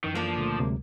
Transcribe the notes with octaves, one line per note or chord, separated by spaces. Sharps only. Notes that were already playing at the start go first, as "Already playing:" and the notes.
F#2 D#3 E3
F3 A#3 D4
C#2 A#2 D3 A3
D2 C3 F#3 G#3 A#4